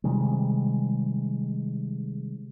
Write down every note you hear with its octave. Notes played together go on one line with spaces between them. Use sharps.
C3 D#3 G3 G#3